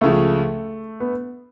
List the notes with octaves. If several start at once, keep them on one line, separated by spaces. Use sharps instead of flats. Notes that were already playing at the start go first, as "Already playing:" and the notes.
C#2 C#3 F3 A3
B3